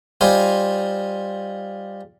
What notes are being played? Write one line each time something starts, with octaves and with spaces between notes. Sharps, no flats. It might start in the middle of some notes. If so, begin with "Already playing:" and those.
G3 D#4 F4 C5 G#5